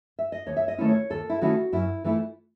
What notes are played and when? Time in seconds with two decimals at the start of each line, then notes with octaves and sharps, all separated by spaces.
0.19 E5
0.32 D#5
0.46 D#2 C#5
0.56 E5
0.68 D#5
0.78 D#3 A3 C#4 E4
0.89 C#5
1.10 D#2 A4
1.30 E4
1.41 D#3 A3 C#4 E4 F#4
1.72 F#2 E4
2.04 E3 A3 E4